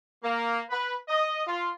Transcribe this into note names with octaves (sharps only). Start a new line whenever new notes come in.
A#3
B4
D#5
F4